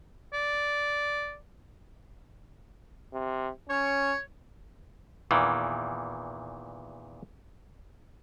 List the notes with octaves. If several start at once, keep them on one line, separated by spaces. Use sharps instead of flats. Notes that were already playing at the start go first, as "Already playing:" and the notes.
D5
C3
C#4 C#5
E2 A#2 D#3 E3